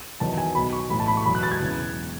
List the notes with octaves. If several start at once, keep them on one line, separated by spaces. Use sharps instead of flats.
E2 D#3 F#3 A5
G#5
B1 B2 F#3 B5
C#6
A1 A2 E3 B5
A5
B5
C#6
E1 E2 B2 F#3 B5
F#6
A6
G#6
E2 C#3 E3